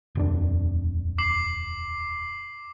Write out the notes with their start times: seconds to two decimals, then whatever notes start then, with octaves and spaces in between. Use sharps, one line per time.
0.15 D#1 F2 D4
1.18 D6 C7 F#7